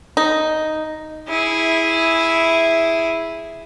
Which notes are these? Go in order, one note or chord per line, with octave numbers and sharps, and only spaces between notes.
D#4
E4 G#4